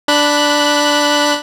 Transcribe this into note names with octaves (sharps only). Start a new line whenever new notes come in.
D4 B5 F#6